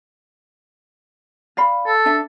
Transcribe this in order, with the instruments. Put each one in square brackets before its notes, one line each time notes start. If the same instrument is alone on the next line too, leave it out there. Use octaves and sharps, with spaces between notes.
[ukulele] D5 F5 B5
[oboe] A4
[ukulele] D4 E5